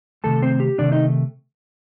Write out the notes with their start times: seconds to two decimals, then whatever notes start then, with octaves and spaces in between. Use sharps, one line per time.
0.24 C3 D#3 A3 A4 A5
0.42 C4 C5
0.60 G4
0.78 C3 D#3 A3 D4 D5
0.92 D#4 D#5